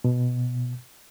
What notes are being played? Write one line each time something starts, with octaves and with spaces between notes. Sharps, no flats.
B2